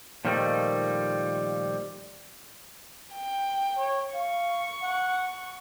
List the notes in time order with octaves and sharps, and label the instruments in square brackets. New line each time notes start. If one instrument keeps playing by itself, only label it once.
[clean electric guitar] A#2 D#3 F3 G3 A3 D#4
[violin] G5
[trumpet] C#5
[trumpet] F5 [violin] C#6
[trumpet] F#5